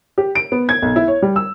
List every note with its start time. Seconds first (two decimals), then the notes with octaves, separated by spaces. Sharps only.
0.18 G4
0.35 D7
0.52 B3
0.69 G#6
0.82 B1
0.96 E4
1.08 C#5
1.22 G3
1.36 E6